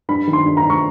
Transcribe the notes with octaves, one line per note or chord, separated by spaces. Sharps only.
G2 B5
D#3
C6
G2
A#5
G2
C#6